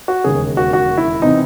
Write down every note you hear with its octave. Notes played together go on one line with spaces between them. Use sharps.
F#4
E1 D#2 C#3 G#4
F#4
F#4
E4
C3 E3 C4 D#4